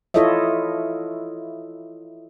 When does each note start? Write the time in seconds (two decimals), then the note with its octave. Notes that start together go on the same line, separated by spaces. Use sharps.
0.14 E4 F4 A4 C#5 D#5 E5